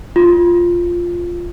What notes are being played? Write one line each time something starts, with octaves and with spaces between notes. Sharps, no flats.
F4